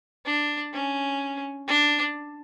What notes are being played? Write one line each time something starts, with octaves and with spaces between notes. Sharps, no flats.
D4
C#4
D4